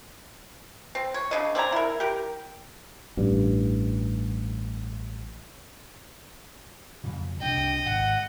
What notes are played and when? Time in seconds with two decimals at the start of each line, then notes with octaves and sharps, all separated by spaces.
0.95 C4
1.14 C#5
1.31 C#3 D4 D#5
1.55 C4 D5 G#5 A#5
1.72 E4 A#4
2.00 G4 A#4
3.17 A1 G2
7.04 F2 C#3
7.41 C2 C3 D4 D#5 G5
7.86 G#1 F#5